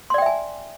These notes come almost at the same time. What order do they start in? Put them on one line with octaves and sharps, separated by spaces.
C6 D5 G5 E5 G#5